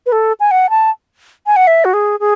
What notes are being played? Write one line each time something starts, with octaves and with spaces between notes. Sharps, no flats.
B4
A4
G#5
F#5
A5
G#5
F#5
E5
F#4
G#4
G#4